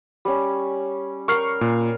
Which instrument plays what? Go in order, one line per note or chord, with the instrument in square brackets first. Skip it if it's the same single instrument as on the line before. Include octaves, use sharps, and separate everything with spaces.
[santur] G3 C#4
[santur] A#4 G5 [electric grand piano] C#6 F6 C7
[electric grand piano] A#2